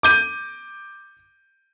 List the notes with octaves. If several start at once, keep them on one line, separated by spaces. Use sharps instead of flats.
D6 G6 D#7